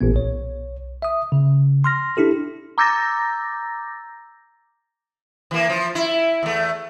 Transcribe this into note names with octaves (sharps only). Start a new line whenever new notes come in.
A1 A#2 B3
B1 C#5
E5 D#6
C#3
C6 F6 A#6
D4 E4 G4 A4
A#5 D6 E6 G6 A6 A#6
E3 A#3
F3
E4
E2 A3